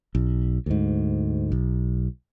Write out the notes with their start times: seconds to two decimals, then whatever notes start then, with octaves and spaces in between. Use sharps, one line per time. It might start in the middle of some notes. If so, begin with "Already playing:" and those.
0.15 B1
0.66 D2 G#2
1.52 B1